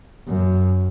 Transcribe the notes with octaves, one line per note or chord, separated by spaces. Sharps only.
F#2